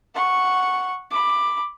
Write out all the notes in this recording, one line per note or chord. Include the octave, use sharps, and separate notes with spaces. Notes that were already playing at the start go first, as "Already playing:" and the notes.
F#5 C#6
B5 D6